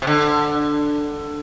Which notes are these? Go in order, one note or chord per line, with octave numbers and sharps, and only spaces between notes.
C3
D3